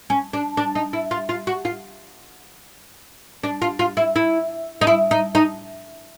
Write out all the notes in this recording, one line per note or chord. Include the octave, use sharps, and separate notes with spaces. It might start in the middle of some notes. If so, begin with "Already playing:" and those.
C#4
D4
D4
D#4
E4
F4
F4
F#4
F4
D4
F4
F4
E4
E4
D#4
E4
D#4
D#4